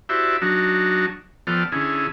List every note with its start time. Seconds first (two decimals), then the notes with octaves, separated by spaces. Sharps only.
0.09 E4 F#4 G4 C5 D5 E5
0.42 F#3 D4 D#4 F#4
1.47 F3 B3 A4 D5 G5 F6
1.72 D3 C#4 E4 G#4